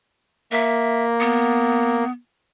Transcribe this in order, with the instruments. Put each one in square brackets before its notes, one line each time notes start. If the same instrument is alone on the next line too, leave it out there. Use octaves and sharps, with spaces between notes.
[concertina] A#3 [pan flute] E5
[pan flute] B3